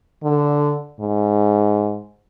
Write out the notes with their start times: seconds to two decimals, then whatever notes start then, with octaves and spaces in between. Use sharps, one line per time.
0.23 D3
1.00 G#2